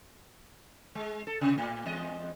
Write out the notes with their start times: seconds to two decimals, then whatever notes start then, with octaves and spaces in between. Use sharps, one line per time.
0.95 G#3
1.27 A4
1.41 C3
1.58 A2
1.86 E2 G#3 D#5